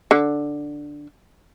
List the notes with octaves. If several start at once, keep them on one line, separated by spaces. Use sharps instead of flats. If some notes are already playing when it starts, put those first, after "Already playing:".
D3